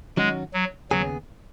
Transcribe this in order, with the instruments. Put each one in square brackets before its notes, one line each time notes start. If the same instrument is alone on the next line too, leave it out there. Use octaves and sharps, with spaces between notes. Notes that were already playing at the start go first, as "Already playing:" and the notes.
[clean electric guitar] D#3 F#3 C#4 F#4 [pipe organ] G#3
[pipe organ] F#3
[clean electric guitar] D#2 C#3 B3 G#4 [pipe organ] F#3